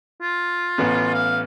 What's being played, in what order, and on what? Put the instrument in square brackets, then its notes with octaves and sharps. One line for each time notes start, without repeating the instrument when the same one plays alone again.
[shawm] F4
[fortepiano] A1 B3
[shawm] F5